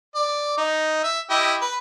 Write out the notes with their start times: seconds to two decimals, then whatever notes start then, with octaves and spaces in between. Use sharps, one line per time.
0.15 D5
0.58 D#4
1.04 E5
1.30 E4 G4 D#5
1.62 B4